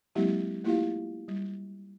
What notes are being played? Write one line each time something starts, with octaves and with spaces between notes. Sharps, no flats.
F#3 G#3 A#3 C4 E4 G4
A3 A#3 E4 F4 G4 F5
G3